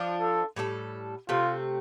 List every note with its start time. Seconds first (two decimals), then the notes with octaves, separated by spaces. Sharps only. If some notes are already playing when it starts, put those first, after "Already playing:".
Already playing: F3 D4 F4
0.21 A4
0.56 A2 G3 F4 A4
1.29 C3 A3 C4 F4